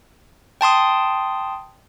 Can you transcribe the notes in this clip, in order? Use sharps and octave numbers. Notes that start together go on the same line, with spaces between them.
G5 A5 C6 D#6